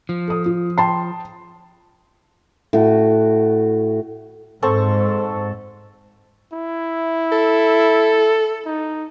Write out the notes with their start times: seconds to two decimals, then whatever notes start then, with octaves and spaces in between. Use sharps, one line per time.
0.09 F3
0.28 A4 D#6
0.46 F4
0.78 G5 A5 C6
2.73 A2 F#4
4.62 G#2 C4 A4 C#6
6.53 E4
7.32 A4
8.65 D#4